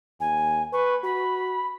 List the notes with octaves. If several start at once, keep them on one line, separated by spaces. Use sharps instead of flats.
D#2 G#5
B4 C#6
F#4 B5